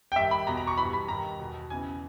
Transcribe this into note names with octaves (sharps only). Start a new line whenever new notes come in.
G5
G2 D#3 E5
B5
E2 B2 A#5
A#5
C#6
G2 E3 B5
B5
G2 D#3 A#5
E2 B2
E2 C#3 E3 G#5